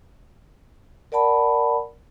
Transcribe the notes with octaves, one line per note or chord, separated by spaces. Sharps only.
A#4 D5 F#5 A5 B5